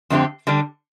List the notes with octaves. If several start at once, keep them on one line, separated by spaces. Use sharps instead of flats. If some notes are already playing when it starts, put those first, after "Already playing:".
F2 D3 A3 C4 G4
D3 G3 D4